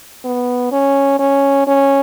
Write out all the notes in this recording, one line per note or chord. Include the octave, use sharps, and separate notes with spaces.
B3
C#4
C#4
C#4